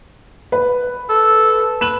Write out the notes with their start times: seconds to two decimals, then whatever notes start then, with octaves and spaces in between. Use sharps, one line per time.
0.52 B4
1.09 A4
1.81 B4 E7 F#7